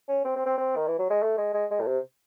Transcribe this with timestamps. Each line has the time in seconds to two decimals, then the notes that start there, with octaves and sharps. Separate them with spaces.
0.09 C#4
0.25 C4
0.36 C4
0.46 C4
0.58 C4
0.76 D#3
0.88 E3
0.99 F#3
1.10 G#3
1.23 A3
1.38 G#3
1.54 G#3
1.71 G#3
1.80 A2
1.87 C3